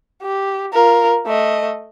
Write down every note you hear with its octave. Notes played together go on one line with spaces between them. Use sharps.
G4
F4 A#4
A3 D#5